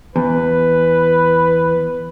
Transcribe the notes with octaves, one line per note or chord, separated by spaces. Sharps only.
E2 B4